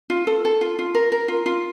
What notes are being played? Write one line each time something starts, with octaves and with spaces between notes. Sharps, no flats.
F4
A4
A4
F4
F4
A#4
A#4
F4
F4